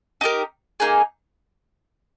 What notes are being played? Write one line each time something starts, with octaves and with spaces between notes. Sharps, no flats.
D#4 G4 A#4
A#3 D#4 G#4